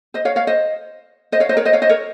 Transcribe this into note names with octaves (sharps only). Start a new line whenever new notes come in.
C5 D#5
C#5 F5
C#5 F5
C5 D#5
C5 D#5
C#5 F5
C5 D#5
A#4 C#5
C5 D#5
C#5 F5
C5 D#5
A#4 C#5